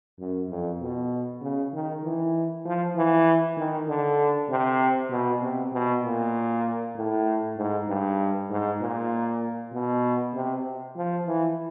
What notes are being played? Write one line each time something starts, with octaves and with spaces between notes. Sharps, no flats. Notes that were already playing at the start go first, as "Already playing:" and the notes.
F#2
F2
B2
C#3
D#3
E3
F3
E3
D#3
D3
C3
B2
C3
B2
A#2
A2
G#2
G2
G#2
A#2
B2
C3
F3
E3